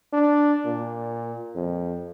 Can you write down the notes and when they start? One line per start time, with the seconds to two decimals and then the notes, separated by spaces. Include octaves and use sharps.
0.13 D4
0.65 A#2
1.55 F2